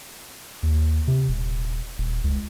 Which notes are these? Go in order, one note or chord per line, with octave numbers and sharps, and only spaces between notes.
D#2
C3
D#1
D#1
C#2